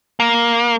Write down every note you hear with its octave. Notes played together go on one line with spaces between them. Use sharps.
A#3